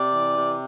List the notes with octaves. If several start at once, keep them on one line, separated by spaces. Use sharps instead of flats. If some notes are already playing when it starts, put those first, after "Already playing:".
Already playing: C3 D5
E3
C3